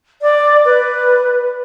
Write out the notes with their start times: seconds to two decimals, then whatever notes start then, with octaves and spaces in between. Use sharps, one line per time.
0.22 D5
0.65 B4